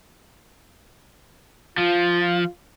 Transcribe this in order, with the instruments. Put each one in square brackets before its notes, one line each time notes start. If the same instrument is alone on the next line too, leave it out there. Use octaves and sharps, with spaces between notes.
[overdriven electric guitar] F3 [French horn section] F4